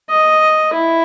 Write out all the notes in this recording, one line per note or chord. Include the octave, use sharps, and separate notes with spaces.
D#5
E4